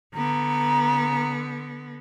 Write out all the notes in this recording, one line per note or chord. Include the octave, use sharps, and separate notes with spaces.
D3 B3 A#5